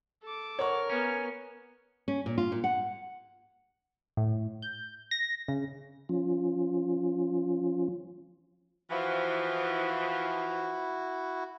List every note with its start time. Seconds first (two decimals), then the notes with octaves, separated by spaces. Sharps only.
0.23 A4 D6
0.59 A#4 C#5 F#5 C#6 F6
0.90 B3 C#4
2.08 C#4
2.26 A#2
2.38 F4
2.52 A#2
2.64 F#5
4.17 A2
4.62 G6
5.11 A#6
5.48 C#3
6.09 F3 C#4 F4
8.90 E3 F3 E4 F#4